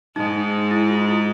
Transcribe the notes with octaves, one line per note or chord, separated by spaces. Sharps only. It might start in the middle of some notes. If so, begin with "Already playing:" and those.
G#2 G#3 D#4
E4
F4
E4